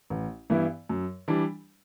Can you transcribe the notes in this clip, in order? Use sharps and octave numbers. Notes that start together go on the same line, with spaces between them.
A1
G2 E3 B3 E4
F#2
E3 G3 D4